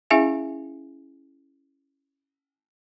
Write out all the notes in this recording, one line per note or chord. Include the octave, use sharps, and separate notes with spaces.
C#4 E4 G#4 E5 F5 G#5